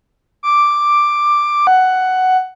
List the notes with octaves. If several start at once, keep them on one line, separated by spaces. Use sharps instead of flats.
D6
F#5